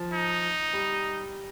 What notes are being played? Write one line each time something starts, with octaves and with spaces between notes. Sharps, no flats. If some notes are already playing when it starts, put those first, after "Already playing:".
Already playing: F3
D#4
G3